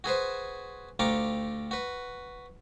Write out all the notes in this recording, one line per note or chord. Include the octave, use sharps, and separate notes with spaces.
F#4 G#4 B4 C5
D2 F4 G4 A#5 C#6 D6
F#4 B4